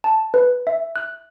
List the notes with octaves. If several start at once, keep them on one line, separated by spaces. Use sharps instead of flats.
A5
B4
E5
F#6